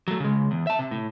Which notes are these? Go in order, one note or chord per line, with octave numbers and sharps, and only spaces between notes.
F#3 A3
C#3 G#3
E2
E5 A5
C3
A2